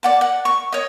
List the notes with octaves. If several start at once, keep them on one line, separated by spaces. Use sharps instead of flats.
D5 F#5 A5
F#5
C#6
C#5 D#5